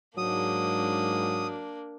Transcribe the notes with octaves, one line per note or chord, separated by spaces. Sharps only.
G#2 F#3 A#3 D4 D#6